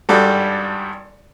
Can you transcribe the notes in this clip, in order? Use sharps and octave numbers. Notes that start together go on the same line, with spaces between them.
G#1 G2 G3 F#4 A4